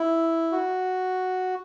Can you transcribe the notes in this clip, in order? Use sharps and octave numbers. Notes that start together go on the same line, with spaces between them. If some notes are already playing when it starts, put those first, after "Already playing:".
Already playing: E4
F#4